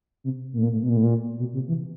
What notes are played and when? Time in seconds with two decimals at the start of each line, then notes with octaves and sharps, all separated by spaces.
0.24 C3
0.53 A#2
0.58 A2
0.63 A#2
0.72 A2
0.82 B2
0.89 A#2
0.97 A2
1.03 A#2
1.39 B2
1.54 C3
1.68 E3